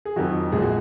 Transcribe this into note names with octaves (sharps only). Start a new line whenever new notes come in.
G#4
F2 D#3 F#3 F#4
A#1 A#2 G#3 G#4
F#4